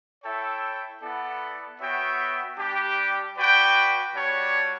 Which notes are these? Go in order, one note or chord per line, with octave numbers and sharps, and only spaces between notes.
E4 A4 C#5 E5 G5
B3 E4 A4 D5 F#5
B3 F#4 C#5 E5 G5
G3 D4 G4
F#4 B4 D5 G5
G3 D4 F#4 C#5